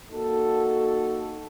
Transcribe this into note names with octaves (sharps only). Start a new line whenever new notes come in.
A#3 D#4 F#4 A4